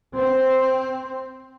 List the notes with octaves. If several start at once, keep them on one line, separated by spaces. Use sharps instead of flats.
C4